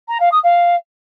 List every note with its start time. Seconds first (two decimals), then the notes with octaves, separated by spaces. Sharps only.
0.08 A#5
0.20 F5
0.32 D#6
0.43 F5